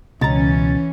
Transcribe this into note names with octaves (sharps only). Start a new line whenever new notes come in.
C#2 B2 E3 C#4 A#5 A6